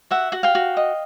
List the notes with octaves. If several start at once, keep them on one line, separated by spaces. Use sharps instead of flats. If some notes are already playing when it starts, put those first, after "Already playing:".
F#4 E5 F#5
F#4 F#5
F5 G5
F#4
D#5